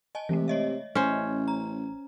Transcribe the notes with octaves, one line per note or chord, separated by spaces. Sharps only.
D#5 G#5 A5
C3 E3 G#3 A3
C#5 D#5 E5
A1 C#4 C5
A#5